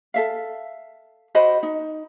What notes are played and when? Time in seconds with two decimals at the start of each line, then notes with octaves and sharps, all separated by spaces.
0.14 A4 E5 F5
1.35 F#4 C5 D#5 B5
1.63 D#4